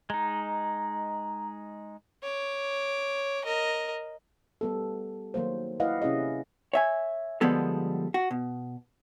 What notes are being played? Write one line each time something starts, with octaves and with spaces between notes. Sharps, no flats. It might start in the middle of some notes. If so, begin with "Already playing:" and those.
G#3 D#4 A#5
C#5 D6
A#4 D#5
G3 B3 A4
D#3 F#3 A#3 C5
E4 B4 D5 D#5 F5 F#5
C3 C#4 E4 G#4 D#5
C#5 E5 G#5
D3 F3 G3 G#3 B3 A4
F#4
B2